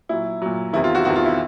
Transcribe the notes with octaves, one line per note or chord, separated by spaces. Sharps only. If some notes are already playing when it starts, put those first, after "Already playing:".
A#2 F#3 E4
A#2 F#3
E2 C3 D#3 E4
F4
F#4
E2 C3 D#3 F#4
F4
E4